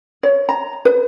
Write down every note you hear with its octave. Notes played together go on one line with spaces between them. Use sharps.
C#5
A#5
B4